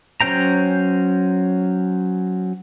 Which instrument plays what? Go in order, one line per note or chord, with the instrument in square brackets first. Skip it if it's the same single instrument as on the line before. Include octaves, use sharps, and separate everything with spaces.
[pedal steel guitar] F#3 C#4 C5 G5 A#5